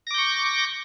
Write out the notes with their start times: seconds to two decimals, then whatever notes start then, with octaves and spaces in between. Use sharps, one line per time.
0.07 A#6
0.11 D6
0.14 G6
0.18 C#6